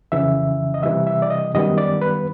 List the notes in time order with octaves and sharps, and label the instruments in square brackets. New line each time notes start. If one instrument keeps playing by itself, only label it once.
[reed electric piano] F2 C#3 E3 E5
D#5
C3 E3 G3 E5
E5
D5
D#5
F#2 D#3 G3 B3 D#5
D5
B4